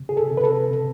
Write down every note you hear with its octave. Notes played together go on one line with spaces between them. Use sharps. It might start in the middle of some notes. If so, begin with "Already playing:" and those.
Already playing: C3
G#4
A4
C3
B4
A4
C3